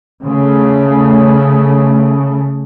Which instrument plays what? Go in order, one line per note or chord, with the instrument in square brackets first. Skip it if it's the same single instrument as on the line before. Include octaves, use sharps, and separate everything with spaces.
[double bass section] C#3 A3